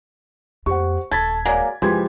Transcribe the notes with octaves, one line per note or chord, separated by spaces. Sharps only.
F2 A#3 G4 C5 F#5 C#6
D#1 A4 G#6 A6 B6
F#3 G#3 A#3 D5
F#1 E3 F3 G#3 G4 C6 G#6